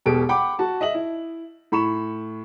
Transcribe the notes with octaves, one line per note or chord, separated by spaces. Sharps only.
E1 B2 G4 A4 D7
F#5 G5 B5 D6
F#4 A5
D#5 E5 F#7
E4
A2 B5 C#6 E7